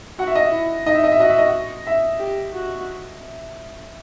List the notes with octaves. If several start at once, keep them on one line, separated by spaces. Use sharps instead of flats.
F#4 F#5
E5
D#5
E5
E4
D#4 D#5
E5
D#5
E5
F#4 D#5
E5
D#5
E5
G4
F#4